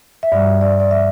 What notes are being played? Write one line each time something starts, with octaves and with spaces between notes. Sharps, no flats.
E5
G2 G3 D5
D5
D5
E5